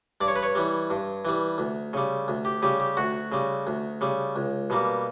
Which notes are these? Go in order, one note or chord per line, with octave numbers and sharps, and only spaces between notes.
G2 D5
C#5
B4
C#5
E3 G3
G2
E3 G3
D2
C#3 G3
D2
G4
C#3 G3 G4
G4
D2 F#4
C#3 G3
D2
C#3 G3
C#2
B2 G3 A#3